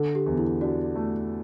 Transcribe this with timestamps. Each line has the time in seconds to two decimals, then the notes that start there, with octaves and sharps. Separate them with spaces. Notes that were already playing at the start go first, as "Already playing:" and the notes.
Already playing: D3 A4
0.15 G4
0.26 E2
0.38 E4
0.61 D4 F#4
0.96 A3